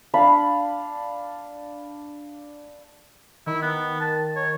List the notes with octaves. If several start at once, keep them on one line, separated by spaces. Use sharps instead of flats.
D4 F5 B5
D#3 E4
B3
A5
C#5